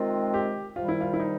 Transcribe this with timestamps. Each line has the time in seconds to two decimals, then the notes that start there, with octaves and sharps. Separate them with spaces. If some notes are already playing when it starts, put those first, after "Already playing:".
Already playing: C3 D#3 G#3 C4 F4
0.34 G4
0.76 C3 D#3 G3 F4
0.88 E4
1.01 F4
1.13 E4
1.19 D#4